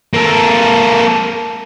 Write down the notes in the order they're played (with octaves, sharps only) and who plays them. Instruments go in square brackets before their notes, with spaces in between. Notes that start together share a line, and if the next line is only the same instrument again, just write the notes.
[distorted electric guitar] A#3 A4